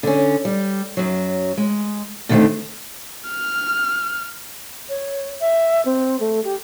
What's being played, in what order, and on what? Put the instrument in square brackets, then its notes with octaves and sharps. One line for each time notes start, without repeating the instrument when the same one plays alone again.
[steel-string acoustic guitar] D3 C#4
G3
F#2 F#3
G#3
B2 D3 D#3 G3 A3 C4
[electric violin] F6
[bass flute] C#5
E5
C4
A3
G4